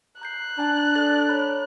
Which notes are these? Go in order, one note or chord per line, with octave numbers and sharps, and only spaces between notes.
A#5 F#6 G6 C7
D4 G#5 A#5
A4 D5 A6
C#5 A#5 B5